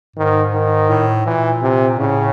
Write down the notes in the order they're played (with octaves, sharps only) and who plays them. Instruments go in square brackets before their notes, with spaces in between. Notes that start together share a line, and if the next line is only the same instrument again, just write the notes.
[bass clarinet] G#2 [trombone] D#3
[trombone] D#3
[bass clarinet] A2
[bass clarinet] A#2 [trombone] E3
[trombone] C3
[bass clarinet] A2 [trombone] C#3